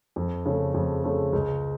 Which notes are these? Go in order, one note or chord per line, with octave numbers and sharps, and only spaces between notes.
F2
C#3 A3
F2
C#3 A3
C#2